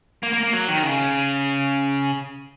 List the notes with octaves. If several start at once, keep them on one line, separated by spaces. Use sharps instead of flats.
A#3
A#3
A#3
F#3
D#3
C#3